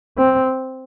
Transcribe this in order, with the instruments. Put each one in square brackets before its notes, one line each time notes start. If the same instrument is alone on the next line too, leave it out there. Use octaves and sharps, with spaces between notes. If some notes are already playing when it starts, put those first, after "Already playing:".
[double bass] C4